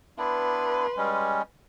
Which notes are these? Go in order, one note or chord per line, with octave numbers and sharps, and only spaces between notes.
B3 D4 E4 B4 C6
G3 G#3 C#4